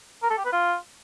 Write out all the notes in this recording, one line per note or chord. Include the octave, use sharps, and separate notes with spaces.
A#4
A4
G4
B4
F4